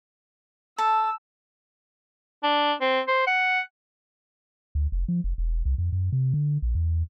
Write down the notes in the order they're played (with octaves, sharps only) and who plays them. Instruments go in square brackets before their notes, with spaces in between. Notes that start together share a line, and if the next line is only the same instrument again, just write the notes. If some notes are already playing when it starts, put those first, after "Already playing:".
[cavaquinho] A4 [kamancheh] E6
[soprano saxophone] D4
C4
C5
F#5
[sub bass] D2
F1
F3
F1
E1
C2
F2
F#2
C3
D3
A#1
E2